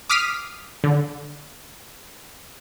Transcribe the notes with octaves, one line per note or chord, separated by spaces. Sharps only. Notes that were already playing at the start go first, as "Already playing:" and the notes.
D6 D#6 F6 B6 C7 D#7
D3